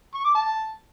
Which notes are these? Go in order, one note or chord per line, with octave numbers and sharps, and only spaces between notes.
C#6
D6
A5